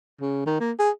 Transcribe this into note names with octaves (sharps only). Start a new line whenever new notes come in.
C#3
D#3
A#3
G#4